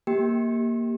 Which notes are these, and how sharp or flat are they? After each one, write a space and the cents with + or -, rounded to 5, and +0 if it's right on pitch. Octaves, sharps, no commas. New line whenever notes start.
A#3 +0 G4 +0 G5 +0